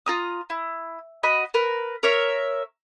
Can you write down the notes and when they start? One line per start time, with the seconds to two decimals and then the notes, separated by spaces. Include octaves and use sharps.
0.06 F4 A#5 D#6
0.50 E4
1.23 F#4 D#5 B5
1.54 A#4 B4
2.03 A#4 C#5 E5